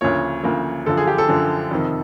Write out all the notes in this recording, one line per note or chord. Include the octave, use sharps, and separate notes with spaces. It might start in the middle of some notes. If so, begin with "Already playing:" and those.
D2 C#3 F3 A#3 C#5
D2 C#3 F3 A#3
F#2 D3 F3 A4
G#4
G4
A4
F#2 D3 F3
F2 C3 D#3